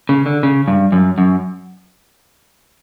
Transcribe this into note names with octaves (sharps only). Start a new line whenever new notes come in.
C#3
D3
C#3
G2
F#2
F#2